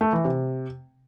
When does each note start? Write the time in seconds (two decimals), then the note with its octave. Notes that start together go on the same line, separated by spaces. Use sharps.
0.01 A3
0.13 E3
0.25 C3